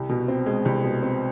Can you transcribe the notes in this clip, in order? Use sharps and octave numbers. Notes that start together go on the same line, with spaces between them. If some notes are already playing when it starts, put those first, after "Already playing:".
Already playing: C2
B2
C4
G#3
C2
B2
C4